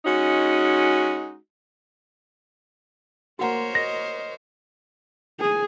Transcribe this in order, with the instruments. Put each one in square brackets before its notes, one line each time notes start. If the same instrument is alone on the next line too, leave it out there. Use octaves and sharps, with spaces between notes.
[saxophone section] G#3 C#4 D#4 F#4
[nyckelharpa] A#3 [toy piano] F#4 F#5 A#5 [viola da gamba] A#4 C5 C#5
[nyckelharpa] D#5 [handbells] A#6
[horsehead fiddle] G#4